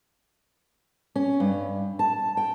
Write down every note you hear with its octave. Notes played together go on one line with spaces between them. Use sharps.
C#4
G2
A5
G5